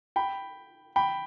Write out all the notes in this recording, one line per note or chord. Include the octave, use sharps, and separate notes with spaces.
G5 B5
G5 B5